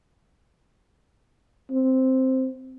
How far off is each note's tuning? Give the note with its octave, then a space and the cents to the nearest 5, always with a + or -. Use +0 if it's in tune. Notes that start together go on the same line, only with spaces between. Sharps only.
C4 +0